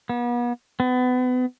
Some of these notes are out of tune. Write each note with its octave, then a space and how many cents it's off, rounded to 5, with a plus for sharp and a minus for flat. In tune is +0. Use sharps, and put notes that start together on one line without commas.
B3 -40
B3 +30